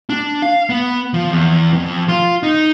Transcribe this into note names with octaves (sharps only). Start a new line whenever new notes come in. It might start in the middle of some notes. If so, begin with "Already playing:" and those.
D4
F5
B3
F3
E2
F2
F4
D#4